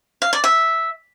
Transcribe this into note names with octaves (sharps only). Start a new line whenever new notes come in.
F5
D5
E5